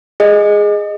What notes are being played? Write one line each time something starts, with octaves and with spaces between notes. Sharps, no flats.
G#4 D#5